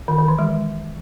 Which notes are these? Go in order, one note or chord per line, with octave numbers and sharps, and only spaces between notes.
D#3
D#3
E3
G#3